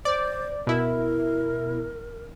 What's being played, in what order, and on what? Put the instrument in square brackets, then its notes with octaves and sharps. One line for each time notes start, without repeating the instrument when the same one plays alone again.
[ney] C5 [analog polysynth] D5
[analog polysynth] B2 E4 [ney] A#4